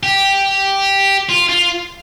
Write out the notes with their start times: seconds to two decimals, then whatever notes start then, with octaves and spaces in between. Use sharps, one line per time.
0.03 G4
1.29 F4
1.49 F4